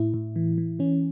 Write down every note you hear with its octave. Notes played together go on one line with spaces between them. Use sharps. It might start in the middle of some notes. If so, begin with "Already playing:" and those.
Already playing: A2 E4
A2
E3
E3
E3 C#4